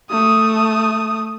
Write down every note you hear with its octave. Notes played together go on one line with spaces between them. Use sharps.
A3 D#6